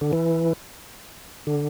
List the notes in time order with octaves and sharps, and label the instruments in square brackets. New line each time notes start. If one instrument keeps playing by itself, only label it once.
[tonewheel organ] D3
E3
D3